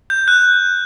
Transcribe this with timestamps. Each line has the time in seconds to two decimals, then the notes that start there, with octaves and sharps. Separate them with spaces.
0.10 G6
0.28 F#6